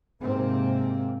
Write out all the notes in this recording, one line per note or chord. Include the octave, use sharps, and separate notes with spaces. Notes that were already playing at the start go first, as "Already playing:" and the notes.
G#2 C3 A#3 C4